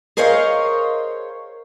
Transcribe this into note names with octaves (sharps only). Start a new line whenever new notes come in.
G#4 A#4 C5 C#5 D#5 F5